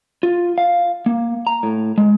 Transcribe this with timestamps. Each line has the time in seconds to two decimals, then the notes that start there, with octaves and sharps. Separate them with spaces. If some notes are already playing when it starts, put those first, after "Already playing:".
0.23 F4
0.58 F5
1.06 A#3
1.47 A#5
1.63 A2
1.98 G#3